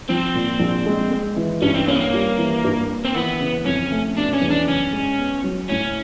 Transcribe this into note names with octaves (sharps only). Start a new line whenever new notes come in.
F3 C4
A#2
A#1
G#3
G#3
E3
G2 C#4
C4
A#3 C#4
B3
A#3
G3
E3
G2
A#3
C4
E3 B3
C#3
F2 C#4
A3
B2 D4
C#4
E2
D4
F#1 C#4
G#3
B3
F#3
A2 C#4